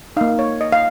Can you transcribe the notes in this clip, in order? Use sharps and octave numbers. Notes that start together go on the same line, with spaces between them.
A#3 D#4 F5
C#5
D#5
F5